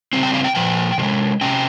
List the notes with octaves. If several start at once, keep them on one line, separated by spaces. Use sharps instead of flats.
C#3 G3 C4
G5
F5
G5
A#2 F3 G5
C3 F3 G#3
C3 G3 C#4 G5